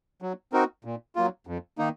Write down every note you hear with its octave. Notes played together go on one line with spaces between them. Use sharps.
F#3
C4 D#4 F#4 A#4
A#2
F#3 A#3 F4
F2
D#3 A#3 D#4